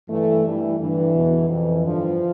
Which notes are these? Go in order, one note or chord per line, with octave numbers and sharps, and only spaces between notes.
G2 E3 A3
G2 E3
G2 D3 E3
E2 B2
F2 E3
G2 D3 F3